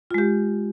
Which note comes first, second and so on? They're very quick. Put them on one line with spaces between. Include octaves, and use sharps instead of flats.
F4 G#3 G4